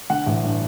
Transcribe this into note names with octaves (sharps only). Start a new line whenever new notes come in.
D3 F#5
A1
G2